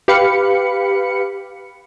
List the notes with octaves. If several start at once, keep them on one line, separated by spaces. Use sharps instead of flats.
G4 B4 F5 B5 C#7